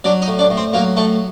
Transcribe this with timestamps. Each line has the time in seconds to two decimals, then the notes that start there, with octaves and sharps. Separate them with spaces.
0.04 F#3 D4 D5
0.22 D#4 D#5
0.28 A2
0.39 D4 D5
0.50 A2
0.57 C4 C5
0.73 F#3 A#3 A#4
0.97 A2 A3 A4